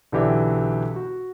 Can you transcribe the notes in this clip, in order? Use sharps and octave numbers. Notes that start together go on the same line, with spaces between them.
B1 D3 E3 G4 D5 E5
F#4